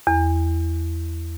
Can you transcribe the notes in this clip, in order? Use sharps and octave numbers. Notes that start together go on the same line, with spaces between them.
E2